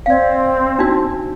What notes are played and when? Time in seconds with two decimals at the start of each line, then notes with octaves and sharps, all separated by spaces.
0.06 C4 D5 F5
0.79 D4 D#4 F#4